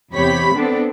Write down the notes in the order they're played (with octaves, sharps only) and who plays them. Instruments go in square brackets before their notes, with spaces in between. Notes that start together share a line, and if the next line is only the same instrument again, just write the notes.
[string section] E2 C3 G4 C#5 B5 B6
B3 C4 D4 A4